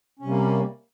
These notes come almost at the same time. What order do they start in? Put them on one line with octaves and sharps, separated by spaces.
C#4 C3 G3 A#3